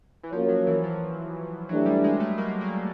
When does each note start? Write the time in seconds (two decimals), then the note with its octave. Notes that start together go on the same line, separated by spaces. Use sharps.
0.23 E3
0.32 F3 A#3 C#4 F#4 A#4 C#5
0.49 F#3
0.67 E3
0.84 F3
1.69 E3 F#3 A3 D4 G4
1.86 G3
2.04 G#3
2.20 A3
2.38 A#3
2.61 A#3